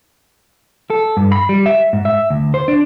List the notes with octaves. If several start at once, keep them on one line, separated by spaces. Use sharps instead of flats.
A4
G2
B5
G3
E5
G#2
E5
D2
C5
D4